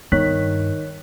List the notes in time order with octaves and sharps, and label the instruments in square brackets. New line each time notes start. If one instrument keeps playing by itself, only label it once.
[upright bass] G2 [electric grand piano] D#3 B6 [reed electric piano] C#5 F#6